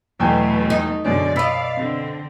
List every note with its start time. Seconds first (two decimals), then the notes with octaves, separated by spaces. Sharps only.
0.20 E2 B2 F#3 A3 G5 G#5
0.70 D#4
1.05 F#2 B2 D3 G#3 C#4 D5
1.36 B2 D5 D#5 F5 B5 E6 B6
1.77 D3 C4